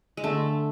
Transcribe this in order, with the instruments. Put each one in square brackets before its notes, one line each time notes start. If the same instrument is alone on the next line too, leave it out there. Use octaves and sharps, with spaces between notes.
[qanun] G#3
[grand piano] D3 [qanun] A3